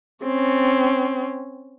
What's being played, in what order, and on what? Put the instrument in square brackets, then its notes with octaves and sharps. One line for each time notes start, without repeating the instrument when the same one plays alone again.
[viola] C4 C#4